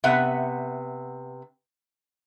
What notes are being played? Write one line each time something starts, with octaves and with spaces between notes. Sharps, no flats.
C3 B3 B4 E5 F#5